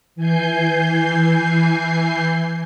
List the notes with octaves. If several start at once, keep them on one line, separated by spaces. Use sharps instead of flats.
E3 G#5 G6 C7